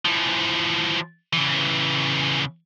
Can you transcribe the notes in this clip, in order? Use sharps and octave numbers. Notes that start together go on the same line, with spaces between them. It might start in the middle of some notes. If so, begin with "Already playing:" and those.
E3 F3
C#3 E3